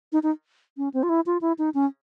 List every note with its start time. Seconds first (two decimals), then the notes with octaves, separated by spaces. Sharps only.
0.13 D#4
0.23 D#4
0.77 C#4
0.94 C4
1.03 F4
1.09 E4
1.26 F4
1.41 E4
1.58 D#4
1.74 C#4